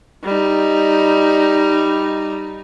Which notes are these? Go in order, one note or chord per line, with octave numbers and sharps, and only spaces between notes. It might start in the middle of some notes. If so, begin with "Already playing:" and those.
G3 D#4